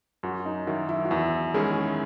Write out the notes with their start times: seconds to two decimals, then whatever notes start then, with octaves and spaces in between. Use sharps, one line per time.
0.23 F#2 F#4
0.45 D#4
0.67 D#3 F#3 E4
0.89 E4
1.05 F#4
1.11 E2 E4
1.54 D#3 G#3 C#4 E4 G#4